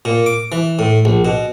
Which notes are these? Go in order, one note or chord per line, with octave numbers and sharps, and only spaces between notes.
A#2
D6
E3
A2
A#1
B2